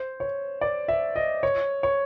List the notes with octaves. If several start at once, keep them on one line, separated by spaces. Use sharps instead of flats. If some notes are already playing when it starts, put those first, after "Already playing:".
Already playing: C5
C#5
D5
E5
D#5
C#5
C#5